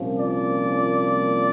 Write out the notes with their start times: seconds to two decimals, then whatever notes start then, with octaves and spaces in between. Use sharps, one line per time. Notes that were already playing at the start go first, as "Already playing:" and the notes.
Already playing: C2 A#2 F3 A#3 C#4
0.19 D5